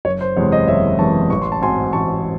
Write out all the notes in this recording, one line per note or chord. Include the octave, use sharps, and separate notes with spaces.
F#1 C#5
C5
E2 C3 E3 G#3 C#5
C5 D#5
F#1 C#5 E5
E2 C3 E3 G#3 A5 C#6
A1 C#6
C6
A5
G#2 F#3 C4 G#5 C6
A1 A5 C#6